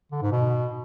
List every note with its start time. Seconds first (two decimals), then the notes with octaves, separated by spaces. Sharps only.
0.12 D3
0.22 G#2
0.32 B2